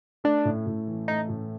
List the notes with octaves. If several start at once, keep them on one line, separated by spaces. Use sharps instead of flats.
A3 D4
A2
A2
E3
A3 D#4
A2